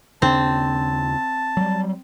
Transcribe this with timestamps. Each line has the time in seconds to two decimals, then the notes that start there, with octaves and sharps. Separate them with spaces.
0.22 D#2 C#3 C4 D4 A5
1.57 F#3 G3